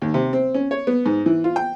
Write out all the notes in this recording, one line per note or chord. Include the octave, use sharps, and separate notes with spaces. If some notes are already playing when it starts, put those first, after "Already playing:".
D#2
C3
C4
C#4
C#5
B3
G#2
E3
F4
G5